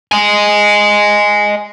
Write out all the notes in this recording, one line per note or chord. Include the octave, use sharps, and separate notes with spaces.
D#5 G#5